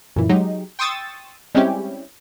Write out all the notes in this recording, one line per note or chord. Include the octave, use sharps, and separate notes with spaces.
F#2 A#2 E3
F#3 G#3 D#4 G4
G5 C6 C#6 D#6 E6 A6
G3 G#3 C4 C#4 E4 G4